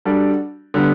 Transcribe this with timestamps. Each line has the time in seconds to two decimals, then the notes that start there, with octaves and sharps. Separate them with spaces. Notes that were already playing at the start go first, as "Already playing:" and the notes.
0.05 G3 D4 F#4 A4 D5
0.74 D3 G3 B3